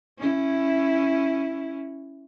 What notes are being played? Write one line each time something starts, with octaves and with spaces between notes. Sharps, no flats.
C#4 E4